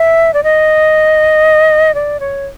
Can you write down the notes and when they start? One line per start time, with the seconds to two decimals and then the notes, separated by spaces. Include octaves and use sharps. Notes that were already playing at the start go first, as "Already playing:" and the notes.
Already playing: E5
0.34 D5
0.43 D#5
1.94 D5
2.20 C#5